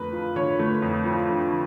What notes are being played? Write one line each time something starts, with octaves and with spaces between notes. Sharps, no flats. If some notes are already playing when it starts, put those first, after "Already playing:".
Already playing: F2 D3 A3 A#4 B4
F3
D3 C#5
A3
F2
F3
D3